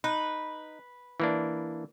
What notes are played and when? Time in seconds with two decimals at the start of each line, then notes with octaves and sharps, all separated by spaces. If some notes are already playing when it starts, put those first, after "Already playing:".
0.04 D#4 B4
1.20 E3 A#3 D4